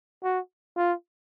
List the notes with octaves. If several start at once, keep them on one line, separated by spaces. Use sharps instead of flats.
F#4
F4